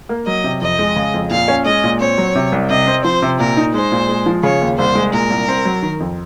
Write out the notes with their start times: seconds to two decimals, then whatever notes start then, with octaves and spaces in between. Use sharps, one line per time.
0.09 A#3
0.27 F#3 D#5
0.44 C3
0.62 F2 D#5
0.79 G#3
0.96 C#3
1.14 F2
1.31 A#2 F5
1.48 C#4
1.65 G#3 D#5
1.84 A#2
2.00 C4 C#5
2.18 F#3
2.35 C3
2.52 C2
2.70 C3 D#5
2.87 C4
3.04 F3 C5
3.22 C3
3.40 A#2 A#4
3.57 D#4
3.74 G#3 C5
3.92 A#2
4.09 G#3
4.26 F3
4.43 C#3 C#5
4.61 D#2
4.78 C2 C5
4.95 G#3
5.13 A#2 A#4
5.30 C2
5.48 C4
5.65 F#3
5.82 D#3
6.00 F2